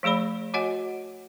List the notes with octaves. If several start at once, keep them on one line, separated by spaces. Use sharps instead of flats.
F3 A3 G#4 D5 B5
F#4 C#5 D#5 F#5 G#5